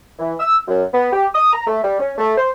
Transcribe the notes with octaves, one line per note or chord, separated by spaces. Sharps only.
E3
E6
F#2
B3
G4
D#6
A#5
A3
G3
C#4
A3
C5